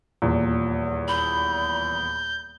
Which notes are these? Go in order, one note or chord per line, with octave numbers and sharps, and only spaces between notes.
D#1 E2 A#2
B5 G6